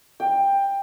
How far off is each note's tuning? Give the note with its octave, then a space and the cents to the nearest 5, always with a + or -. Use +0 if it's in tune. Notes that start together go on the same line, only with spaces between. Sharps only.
G5 +15